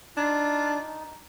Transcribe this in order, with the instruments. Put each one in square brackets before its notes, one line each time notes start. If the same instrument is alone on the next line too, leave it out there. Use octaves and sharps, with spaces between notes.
[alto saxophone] D4 [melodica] D#4 [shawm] F4